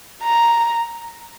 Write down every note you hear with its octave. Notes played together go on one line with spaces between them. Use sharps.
A#5